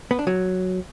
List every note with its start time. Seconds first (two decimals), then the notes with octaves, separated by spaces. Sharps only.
0.11 B3
0.19 D4
0.27 F#3